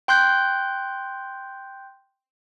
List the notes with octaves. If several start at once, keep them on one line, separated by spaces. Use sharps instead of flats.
G5 C6 F#6 G6